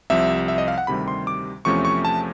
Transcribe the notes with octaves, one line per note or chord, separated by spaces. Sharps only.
C2 C3 F3 E5
E5
D#5
F5
F#5
D2 C3 D#3 G3 B5
C6
D6
E2 C3 F3 A3 C#4 C#6
C#6
A5